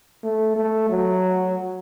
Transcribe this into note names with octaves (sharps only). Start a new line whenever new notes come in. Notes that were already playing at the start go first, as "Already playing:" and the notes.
A3
A3
F#3